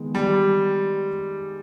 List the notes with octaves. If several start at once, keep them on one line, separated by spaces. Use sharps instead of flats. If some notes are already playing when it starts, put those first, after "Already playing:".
Already playing: D#3 G#3 B3
G3